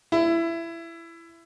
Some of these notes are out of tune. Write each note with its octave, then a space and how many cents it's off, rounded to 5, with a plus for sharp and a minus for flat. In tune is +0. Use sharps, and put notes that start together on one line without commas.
E4 +20